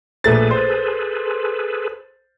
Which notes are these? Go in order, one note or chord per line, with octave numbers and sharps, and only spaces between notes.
A#1 A3 G#4 A4 B4 A6
C5